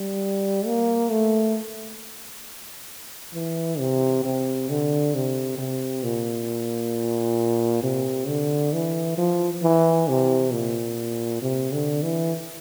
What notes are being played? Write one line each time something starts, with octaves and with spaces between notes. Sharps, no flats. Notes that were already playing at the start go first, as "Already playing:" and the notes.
Already playing: G3
A#3
A3
E3
C3
C3
D3
C3
C3
A#2
C3
D3
E3
F3
E3
C3
A#2
C3
D3
E3